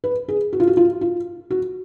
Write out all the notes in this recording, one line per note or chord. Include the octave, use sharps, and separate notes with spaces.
B4
G#4
F#4
F4
F#4
F4
F4
F#4